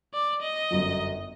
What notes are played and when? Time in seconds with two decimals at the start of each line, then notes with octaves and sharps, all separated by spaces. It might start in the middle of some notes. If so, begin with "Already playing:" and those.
0.14 D5
0.42 D#5
0.71 G1 F#2 F#3